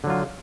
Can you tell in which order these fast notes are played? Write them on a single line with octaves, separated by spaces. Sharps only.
D3 F#3 F4